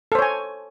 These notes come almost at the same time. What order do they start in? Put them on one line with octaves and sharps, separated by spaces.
A4 C5 C#5 G#5